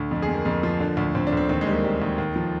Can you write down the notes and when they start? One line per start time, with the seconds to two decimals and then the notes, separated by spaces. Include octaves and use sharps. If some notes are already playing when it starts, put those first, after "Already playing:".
Already playing: D2
0.11 F2
0.22 G#4
0.29 F2
0.34 A#3
0.45 F2 A#3
0.63 F3
0.80 D3
0.97 D2
1.15 D2 C4
1.27 D4
1.33 D2 C4
1.49 D#2 C4
1.61 G#3
1.67 G3
1.72 A#3
1.84 G3
2.02 D#2
2.18 D#2
2.36 F3